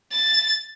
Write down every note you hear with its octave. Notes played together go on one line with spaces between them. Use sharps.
A6